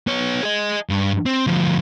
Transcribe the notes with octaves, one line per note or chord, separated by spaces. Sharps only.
B3 C#5
G#4 D#5
G2
C4
D2 F3